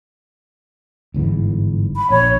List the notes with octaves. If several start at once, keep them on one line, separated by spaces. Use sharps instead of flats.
G1 G#2 E3
B5
A#1 C#5